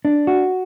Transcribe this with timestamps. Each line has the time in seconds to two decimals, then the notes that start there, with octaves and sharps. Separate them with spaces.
0.05 D4
0.27 F#4